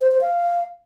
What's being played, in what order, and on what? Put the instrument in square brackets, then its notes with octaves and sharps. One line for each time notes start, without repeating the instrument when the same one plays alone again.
[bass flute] C5
C5
F5